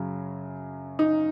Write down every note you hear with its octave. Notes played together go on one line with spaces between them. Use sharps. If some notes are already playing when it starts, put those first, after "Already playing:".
Already playing: F#2 C#3 F#3
D#4